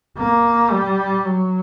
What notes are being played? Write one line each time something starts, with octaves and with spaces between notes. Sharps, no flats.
A#3
G3
F#3